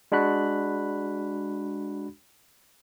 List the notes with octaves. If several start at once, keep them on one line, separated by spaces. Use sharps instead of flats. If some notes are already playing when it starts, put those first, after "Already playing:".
G#3 D4 F#4 B5 F#6